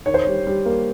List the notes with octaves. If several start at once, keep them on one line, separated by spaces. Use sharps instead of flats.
D#3 C#5
C5
G3 C#5
G3
A#3